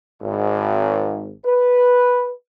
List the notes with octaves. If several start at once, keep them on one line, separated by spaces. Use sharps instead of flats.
G#1
B4